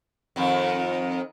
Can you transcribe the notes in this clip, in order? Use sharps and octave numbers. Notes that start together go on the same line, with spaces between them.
F2 D#3